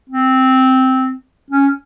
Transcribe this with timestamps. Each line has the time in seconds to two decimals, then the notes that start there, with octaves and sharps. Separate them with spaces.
0.10 C4
1.50 C#4